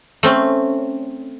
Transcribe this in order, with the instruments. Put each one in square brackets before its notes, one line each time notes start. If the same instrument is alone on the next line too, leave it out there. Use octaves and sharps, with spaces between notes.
[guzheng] A3 C4 C#4